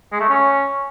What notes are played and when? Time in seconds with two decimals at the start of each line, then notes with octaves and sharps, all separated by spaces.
0.12 G#3
0.20 A3
0.29 C#4